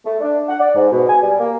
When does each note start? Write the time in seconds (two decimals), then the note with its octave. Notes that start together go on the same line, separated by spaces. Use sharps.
0.05 A3
0.21 D4
0.48 F#5
0.60 D5
0.74 G#2
0.91 B2
1.07 G#5
1.21 G3
1.40 A#3